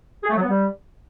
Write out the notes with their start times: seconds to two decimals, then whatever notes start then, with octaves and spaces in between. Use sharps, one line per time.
0.24 G#4
0.30 A3
0.36 F#3
0.42 B3
0.49 G3